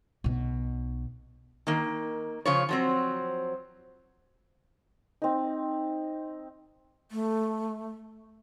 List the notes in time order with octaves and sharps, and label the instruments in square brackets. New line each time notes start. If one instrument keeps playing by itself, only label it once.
[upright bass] B1 B2
[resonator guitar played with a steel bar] D#3 A#3
C#3 F3 C#5
F3 F#3 C4
[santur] C4 D#4
[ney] A3